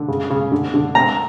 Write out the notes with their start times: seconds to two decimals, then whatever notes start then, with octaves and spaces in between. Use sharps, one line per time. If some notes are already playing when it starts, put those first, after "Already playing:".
Already playing: D3
0.08 C#3
0.30 C#3
0.52 D3
0.74 D3
0.95 C4 A#5